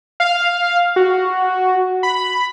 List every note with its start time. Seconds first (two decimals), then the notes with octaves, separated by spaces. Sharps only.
0.20 F5
0.96 F#4
2.03 B5